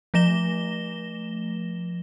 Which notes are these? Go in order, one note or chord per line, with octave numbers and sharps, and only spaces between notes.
F3 A3 A#6 E7 G7